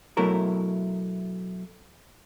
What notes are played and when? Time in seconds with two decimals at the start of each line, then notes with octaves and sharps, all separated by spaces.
0.17 B2 F#3 A3 E4 A#4